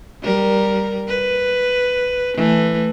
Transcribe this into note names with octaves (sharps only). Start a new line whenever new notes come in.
G3 A#4
B4
E3 A3